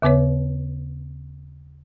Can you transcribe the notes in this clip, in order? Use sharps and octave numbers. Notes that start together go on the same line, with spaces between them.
D#2 C#3 B3 B4 C#5